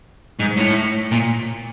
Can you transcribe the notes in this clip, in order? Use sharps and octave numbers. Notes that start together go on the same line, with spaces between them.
G#2
A2
A#2